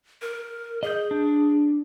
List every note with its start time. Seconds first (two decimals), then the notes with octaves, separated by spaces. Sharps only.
0.22 A#4
0.83 G#4 D#5 G6
1.11 D4